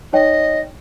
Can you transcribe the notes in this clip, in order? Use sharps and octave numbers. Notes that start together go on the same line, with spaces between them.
D#4 C#5 D#5 G5